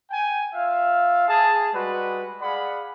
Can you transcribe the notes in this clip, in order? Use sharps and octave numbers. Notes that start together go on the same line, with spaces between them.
G5 G#5
F4 E5 F5
G#4 A5
G3 G#3 F#4 B4
G#4 D5 F5 F#5 B5